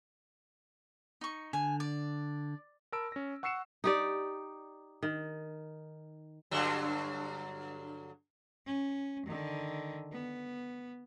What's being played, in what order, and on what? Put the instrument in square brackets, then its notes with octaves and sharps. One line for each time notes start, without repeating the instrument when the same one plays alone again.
[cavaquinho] D#4 C#6
[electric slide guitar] D3 [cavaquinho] G#5
[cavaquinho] D5
[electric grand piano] A#4 A5 B5 E6 D7
C#4 A#6
F#5 C#6 E6 C7 C#7 E7
[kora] D#4 G4 D5
D#3
[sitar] G2 D3 F#3
[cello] C#4
D3 D#3
B3